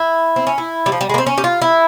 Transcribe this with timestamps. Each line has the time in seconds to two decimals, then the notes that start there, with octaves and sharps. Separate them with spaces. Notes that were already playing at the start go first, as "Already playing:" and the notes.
Already playing: E4
0.36 C4
0.47 C#4
0.58 E4
0.86 G3
0.92 F3
1.01 G3
1.09 G#3
1.14 A#3
1.18 C4
1.26 C#4
1.38 G4
1.44 F4
1.62 E4